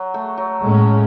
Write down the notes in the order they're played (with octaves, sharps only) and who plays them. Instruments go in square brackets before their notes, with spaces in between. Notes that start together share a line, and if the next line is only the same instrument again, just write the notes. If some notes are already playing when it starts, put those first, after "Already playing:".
Already playing: [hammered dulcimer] F#3
A3
F#3
[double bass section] A2 G#3 C#4